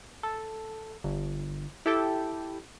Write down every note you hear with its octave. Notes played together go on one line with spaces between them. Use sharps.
A4
G1
E4 G4 A4 G5